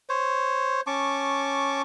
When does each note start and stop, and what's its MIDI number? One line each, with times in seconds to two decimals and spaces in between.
0.09 0.81 72
0.09 0.81 73
0.87 1.82 61
0.87 1.82 81
0.87 1.82 85
0.87 1.82 86